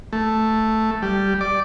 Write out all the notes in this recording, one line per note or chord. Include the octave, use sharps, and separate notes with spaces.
A3
G3
D5